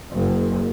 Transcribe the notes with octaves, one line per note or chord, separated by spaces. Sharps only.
F#1